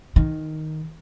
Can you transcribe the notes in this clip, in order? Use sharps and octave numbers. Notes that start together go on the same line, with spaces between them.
D#3